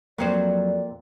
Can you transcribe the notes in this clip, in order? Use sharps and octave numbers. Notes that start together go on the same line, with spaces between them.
F2 F#3 A#3 C4 F4 C5 D5